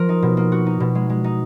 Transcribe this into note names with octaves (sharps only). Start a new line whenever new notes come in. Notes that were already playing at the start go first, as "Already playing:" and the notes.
Already playing: F3 A#4
D#4
B2
A#3
F#4
D#4
B2
G#3
G#3
D#4